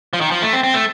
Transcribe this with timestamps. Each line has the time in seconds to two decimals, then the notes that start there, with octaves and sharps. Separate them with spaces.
0.13 F3
0.21 D#3
0.31 F3
0.42 A3
0.53 C4
0.63 C4
0.74 A3